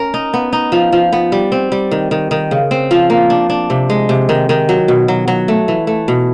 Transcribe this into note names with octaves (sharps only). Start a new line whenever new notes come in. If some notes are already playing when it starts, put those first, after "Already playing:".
Already playing: C#4 A#4
D#4
B3
D#4
F3
F3
B3
G3
C4
G3
D#3
D#3
D#3
C#3
C4
F3
A#3
D4
D4
C3
G#3
C3
D#3
D#3
F#3
B2
F#3
F#3
A3
E3
A3
B2